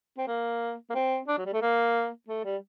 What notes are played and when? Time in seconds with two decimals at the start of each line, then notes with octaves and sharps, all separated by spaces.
0.18 C4
0.28 A#3
0.90 A#3
0.95 C4
1.28 D4
1.38 F#3
1.46 G3
1.53 A3
1.62 A#3
2.29 A3
2.45 G3